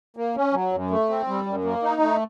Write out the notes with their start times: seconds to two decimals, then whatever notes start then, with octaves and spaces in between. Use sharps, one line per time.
0.17 A#3
0.36 C#4
0.53 F#3
0.72 F#2
0.91 A3
1.09 C4
1.28 G3
1.47 F#2
1.64 A#3
1.83 D#4
2.02 A3